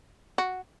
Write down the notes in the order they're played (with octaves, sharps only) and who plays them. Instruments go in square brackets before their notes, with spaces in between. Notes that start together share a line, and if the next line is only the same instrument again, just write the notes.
[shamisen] F#4